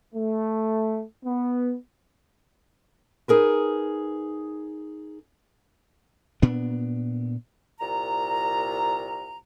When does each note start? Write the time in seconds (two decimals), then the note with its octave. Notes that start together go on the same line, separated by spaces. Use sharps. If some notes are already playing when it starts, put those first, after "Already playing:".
0.13 A3
1.24 B3
3.28 D#4 G#4 A#4 B4
6.42 A#2 B3 D4
7.79 C2 A#2 A#5